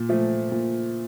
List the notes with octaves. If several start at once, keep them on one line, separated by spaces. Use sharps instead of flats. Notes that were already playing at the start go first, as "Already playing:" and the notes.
Already playing: A#2
F3 A3
A#2